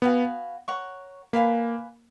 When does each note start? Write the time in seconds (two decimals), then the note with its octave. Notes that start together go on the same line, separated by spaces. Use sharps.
0.02 B3 F#4 B4 F5 G#5
0.68 A#4 C#5 F#5 C#6
1.33 A#3 B4 F5 G#5 B5